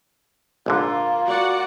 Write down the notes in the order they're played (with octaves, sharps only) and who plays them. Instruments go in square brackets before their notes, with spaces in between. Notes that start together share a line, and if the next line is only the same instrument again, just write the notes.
[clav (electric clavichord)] A#1 G#2 D3 [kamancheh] A#3 F4
[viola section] F#4 D5 F#5